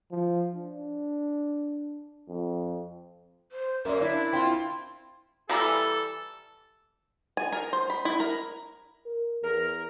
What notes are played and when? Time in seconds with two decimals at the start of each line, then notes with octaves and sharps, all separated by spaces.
0.11 F3
0.55 D4
2.29 F2
3.52 C5
3.85 F#2 A#3 A#4 D5 E5
4.01 D4 E4
4.33 C4 F4 G5
5.49 E3 G3 A4 A#5
7.37 G#5
7.52 A#4
7.73 C5
7.90 B5
8.05 E4
8.20 A#4
9.06 A#4
9.43 E2 A#4